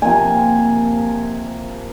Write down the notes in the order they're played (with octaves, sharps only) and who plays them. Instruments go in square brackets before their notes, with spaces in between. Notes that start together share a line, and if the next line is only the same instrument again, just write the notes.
[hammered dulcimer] C3 F3 A#3 G#5